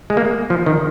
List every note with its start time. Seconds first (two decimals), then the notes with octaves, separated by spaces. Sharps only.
0.10 G#3
0.17 A#3
0.50 F3
0.66 D#3